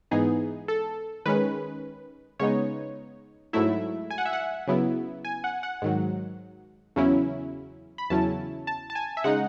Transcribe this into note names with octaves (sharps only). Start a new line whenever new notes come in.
G#2 E3 B3 D#4 G#4
A4
D#3 G#3 C#4 B4
C#3 G#3 B3 D#4 C#5
G#2 F#3 A3 E4 E5
G#5
F#5
E5
F#5
C#3 F#3 B3 E4
G#5
F#5
F#5
G#2 D#3 F#3
E2 C#3 F#3 C#4 E4
B5
E2 C#3 F#3 C#4 E4 A5
A5
A5
G#5
E5
C#3 G#3 D#4 F#5